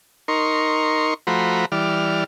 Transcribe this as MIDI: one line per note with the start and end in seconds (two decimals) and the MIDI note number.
0.28 1.14 63
0.28 1.14 70
0.28 1.14 84
0.28 1.14 85
1.27 1.65 53
1.27 1.65 57
1.27 1.65 66
1.27 1.65 72
1.27 1.65 82
1.27 1.65 83
1.72 2.24 52
1.72 2.24 55
1.72 2.24 74
1.72 2.24 89